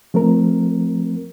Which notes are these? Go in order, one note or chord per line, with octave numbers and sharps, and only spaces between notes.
F3 A3 C4 A#4